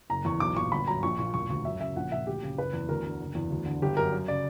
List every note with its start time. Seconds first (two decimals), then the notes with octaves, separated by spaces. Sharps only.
0.10 F#1 A#5
0.25 E2 C#6
0.40 B1 D6
0.56 A#2 C#6
0.72 G1 B5
0.87 F#2 A#5
1.03 A#1 C#6
1.19 A#2 C#6
1.34 E1 C#6
1.50 D2 C#6
1.65 F#2 E5
1.80 C#3 E5
1.96 A#1 F#5
2.12 A#2 E5
2.27 D2 G4
2.43 C#3
2.58 F#1 B4
2.73 E2
2.89 D2 A#4
3.05 D3
3.20 F#1
3.35 E2
3.50 D2
3.66 D3
3.82 G1 G4
3.97 F#2 A#4
4.12 F#2
4.28 C#3 D5